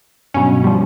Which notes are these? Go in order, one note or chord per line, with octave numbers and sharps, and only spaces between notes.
G2 B2 F#3 C#4
F3 G3